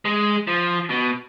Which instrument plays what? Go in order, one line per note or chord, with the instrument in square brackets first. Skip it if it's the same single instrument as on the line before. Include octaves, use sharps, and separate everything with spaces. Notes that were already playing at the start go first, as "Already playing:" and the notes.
[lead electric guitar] G#3
F3
B2